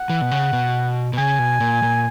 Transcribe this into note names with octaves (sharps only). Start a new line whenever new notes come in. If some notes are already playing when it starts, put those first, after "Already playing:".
Already playing: F#5
E3
B2
C#3
B2
B2
C#3 G#5
B2
A#2
A#2